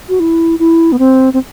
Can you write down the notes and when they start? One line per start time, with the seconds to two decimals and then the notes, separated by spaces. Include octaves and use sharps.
0.09 F#4
0.20 E4
0.59 E4
0.92 B3
0.99 C4
1.34 C4